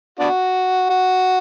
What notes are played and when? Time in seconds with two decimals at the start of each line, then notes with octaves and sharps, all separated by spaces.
0.20 B3 D4 F#4
0.90 F#4